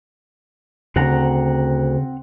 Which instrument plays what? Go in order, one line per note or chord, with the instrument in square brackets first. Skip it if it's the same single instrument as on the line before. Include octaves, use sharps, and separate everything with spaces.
[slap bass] D2 [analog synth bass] C#3 [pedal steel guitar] C4 F#5 A#5